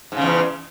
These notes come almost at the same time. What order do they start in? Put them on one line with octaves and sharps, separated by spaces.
G#2 C#3 E2